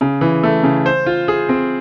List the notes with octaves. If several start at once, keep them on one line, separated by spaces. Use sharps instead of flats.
C#3
E3
A3
C#3
C5
F4
G#4
C4